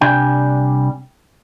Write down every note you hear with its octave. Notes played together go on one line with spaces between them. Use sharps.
C2 C3 G3 D4 G5 G#5